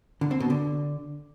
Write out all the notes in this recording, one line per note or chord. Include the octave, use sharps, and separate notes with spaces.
D3
C4
B2
D3